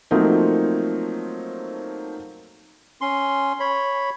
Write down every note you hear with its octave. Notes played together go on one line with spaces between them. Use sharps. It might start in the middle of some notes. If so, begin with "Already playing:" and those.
F3 F#3 A3 A#3 C4 D#4
C#4 C6
C#5 B5